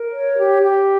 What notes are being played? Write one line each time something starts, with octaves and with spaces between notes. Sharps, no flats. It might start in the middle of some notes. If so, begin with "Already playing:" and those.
Already playing: A#4
C#5
G4
G4